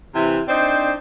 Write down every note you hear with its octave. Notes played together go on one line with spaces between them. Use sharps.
C3 E3
C4 D4 D#4 C5 D5